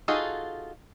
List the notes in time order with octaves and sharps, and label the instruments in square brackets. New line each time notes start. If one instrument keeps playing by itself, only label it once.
[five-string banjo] D#4 F4 F#4 G#4 A4